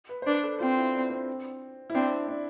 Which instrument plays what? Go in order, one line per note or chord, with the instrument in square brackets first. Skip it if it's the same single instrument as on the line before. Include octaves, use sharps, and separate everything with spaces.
[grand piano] B4
C5
[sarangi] D4 [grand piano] B4
[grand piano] A4
[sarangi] C4 [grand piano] F4
[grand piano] E4
D4
C4
E4
[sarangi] C4 [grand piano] D4
[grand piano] D4